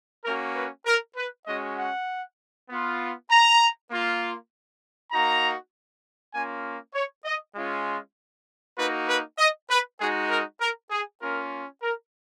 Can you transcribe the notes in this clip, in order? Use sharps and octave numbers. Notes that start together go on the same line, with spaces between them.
A#3 C#4 F#4 A#4
B4
A#4
B4
G#3 C#4 F#4 D#5
F#5
B3 F4
A#5
A#3 F4
A#3 D#4 F#4 A#5
A#3 C#4 F4 G#5
C#5
D#5
G#3 C#4 F4
A#3 D#4 F#4 B4
B4
D#5
B4
G#3 D#4 F#4 G#4
A#4
A#4
G#4
A#3 C#4 F4 A#4
A#4